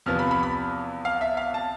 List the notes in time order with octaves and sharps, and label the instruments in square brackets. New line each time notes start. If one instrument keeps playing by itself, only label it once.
[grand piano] E2 C3 F3 B3 F6
B5
B5
B5
F5
E5
F5
A5